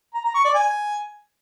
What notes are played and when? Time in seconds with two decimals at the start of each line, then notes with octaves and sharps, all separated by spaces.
0.14 A#5
0.24 A#5
0.34 C#6
0.45 D5
0.55 G#5